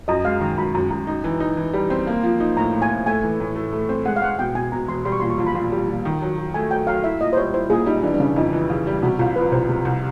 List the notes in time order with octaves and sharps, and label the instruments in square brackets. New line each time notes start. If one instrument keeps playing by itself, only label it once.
[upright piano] F#2 [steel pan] D#5
[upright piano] G#3 [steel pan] F5
[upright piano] D#3 [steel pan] A#5
[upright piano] F#2 [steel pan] B5
[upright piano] F#2
F#2
D#4
E3
D#4
E3
G3
C4
A#3
F3
D#4
[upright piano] A2 [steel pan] A#5
[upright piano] A2
[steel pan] G#5
[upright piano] A2
[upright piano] A3 [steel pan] G#5
[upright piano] E3
A2
A3
A3
C4
[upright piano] G#3 [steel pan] F#5
[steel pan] F5
[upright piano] G#3 [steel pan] F#5
[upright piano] B2 [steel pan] G5
[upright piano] B2 [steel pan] G#5
[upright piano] B2 [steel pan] A#5
[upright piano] E1 [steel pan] C6
[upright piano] G3 [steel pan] C6
[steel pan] C#6
[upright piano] A#2 [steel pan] C6
[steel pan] C#6
[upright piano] A#1 [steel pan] C6
[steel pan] B5
[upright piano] A#2 [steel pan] C6
[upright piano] G3
A#2
D#3
F#3
F#3
[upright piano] A3 [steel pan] G#5
[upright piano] F#3 [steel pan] G5
[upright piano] F#3 [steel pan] F5
[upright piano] E4 [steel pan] E5
[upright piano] A#2 [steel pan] D#5
[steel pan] C5
[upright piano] G3 [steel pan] C#5
[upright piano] E4 [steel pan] C5
[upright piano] A#2 [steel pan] G#4
[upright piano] G3 [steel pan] D#4
[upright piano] E3 [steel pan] D4
[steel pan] D4
[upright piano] C#3 [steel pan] C#4
[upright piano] F2 [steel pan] D#4
[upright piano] E3
C#3
G3
[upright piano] C3 [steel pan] F#4
[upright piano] C2 [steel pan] F4
[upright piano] F3 [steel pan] B4
[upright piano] C2 [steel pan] C5
[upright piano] C3
C2